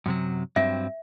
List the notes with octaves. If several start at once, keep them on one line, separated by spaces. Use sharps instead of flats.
F#2 C3 F#3
G2 F#3 C4 E5